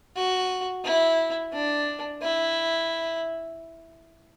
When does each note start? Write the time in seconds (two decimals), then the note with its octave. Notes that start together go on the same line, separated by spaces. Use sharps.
0.16 F#4
0.84 E4
1.53 D4
2.22 E4